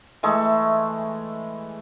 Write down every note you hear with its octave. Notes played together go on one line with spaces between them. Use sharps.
E3 G#3 A3